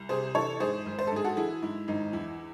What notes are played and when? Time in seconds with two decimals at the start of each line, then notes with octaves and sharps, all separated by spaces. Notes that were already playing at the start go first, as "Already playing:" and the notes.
Already playing: C2
0.09 C3 G#4 C5
0.35 E3 A4 C#5
0.60 G#2 G#4 C5
0.86 G#1
0.99 C5
1.07 A4
1.12 G#2 G#4
1.24 F#4 A4
1.37 E3 E4 G#4
1.62 G#2 E4
1.88 G#1 D#4
2.13 E2 E4